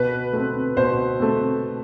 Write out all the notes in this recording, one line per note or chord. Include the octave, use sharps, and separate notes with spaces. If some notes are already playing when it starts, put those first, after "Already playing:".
Already playing: B2 B4
A3 C4
B2 C5
A3 C4